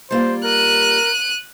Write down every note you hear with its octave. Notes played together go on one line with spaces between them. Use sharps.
G3 A#3 F4 C5
A#4 F#6 D#7